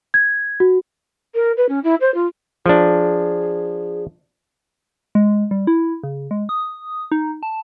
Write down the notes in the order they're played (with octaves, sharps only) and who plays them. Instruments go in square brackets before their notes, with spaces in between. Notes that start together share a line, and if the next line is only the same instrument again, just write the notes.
[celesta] G#6
F#4
[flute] A#4
B4
C#4
E4
C5
F4
[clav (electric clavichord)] F3 D4 [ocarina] G#4
[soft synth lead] G#3
G3
E4
C#3
G#3
D#6
D#4
A5